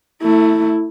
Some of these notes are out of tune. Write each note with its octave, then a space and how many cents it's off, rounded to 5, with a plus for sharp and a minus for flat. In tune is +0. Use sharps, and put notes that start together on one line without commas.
A3 +15 E4 -10